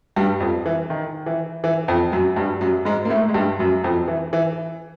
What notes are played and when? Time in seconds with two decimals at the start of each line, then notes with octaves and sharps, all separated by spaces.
0.16 G2 G3
0.40 F2 F3
0.66 E3
0.90 D#3
1.26 E3
1.64 E3
1.88 F2 F3
2.12 F#2 F#3
2.36 G2 G3
2.61 F#2 F#3
2.85 G#2 G#3
3.05 A#3
3.10 A2 A3
3.29 G#3
3.34 G2 G3
3.59 F#2 F#3
3.84 F2 F3
4.08 E3
4.33 E3